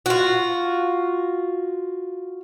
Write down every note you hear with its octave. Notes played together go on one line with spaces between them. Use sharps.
F4 F#4